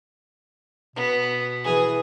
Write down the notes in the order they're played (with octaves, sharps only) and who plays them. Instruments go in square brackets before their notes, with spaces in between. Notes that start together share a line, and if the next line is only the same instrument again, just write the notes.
[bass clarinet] B2 [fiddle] B3
[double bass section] E3 [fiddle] G#4